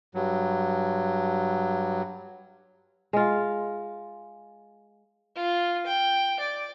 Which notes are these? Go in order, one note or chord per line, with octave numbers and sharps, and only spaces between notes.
G2 F#3
G#3 F4
F4
G5
D5